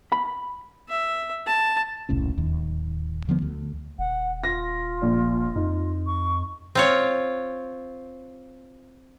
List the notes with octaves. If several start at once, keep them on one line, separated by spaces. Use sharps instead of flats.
B5
E5
A5
E1 C2 A2 C#4
D1 D#2
D#2 D3 F3 B3
D2
D#1 F#5
F4 A#6
A#1 A#2 D5
F2 D#4
C#6
C4 F4 C#5